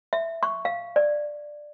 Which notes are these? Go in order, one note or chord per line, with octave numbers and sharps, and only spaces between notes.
E5
C#6
F5
D5